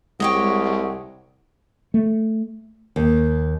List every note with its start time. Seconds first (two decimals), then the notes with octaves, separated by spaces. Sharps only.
0.20 C2 G#3 G4 C#5 D#5 F#5
1.94 A3
2.96 D#2